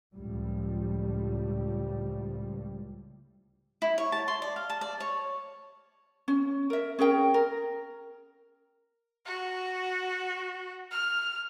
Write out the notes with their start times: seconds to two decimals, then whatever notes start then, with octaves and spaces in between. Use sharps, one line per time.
0.14 C#2 A2 F3 G3
3.82 E4
3.98 C#5
4.12 A5
4.28 C6
4.42 D5
4.56 F5
4.70 A5
4.81 D5
5.00 C#5
6.28 C#4
6.70 A#4 E5
6.99 C#4 G#4 A#4 G5
7.34 A#4
9.26 F#4
10.91 F6